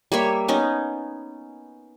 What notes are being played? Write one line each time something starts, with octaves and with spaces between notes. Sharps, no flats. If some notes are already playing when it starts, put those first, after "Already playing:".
G3 A#3 C#5 E5
B3 C#4 D#4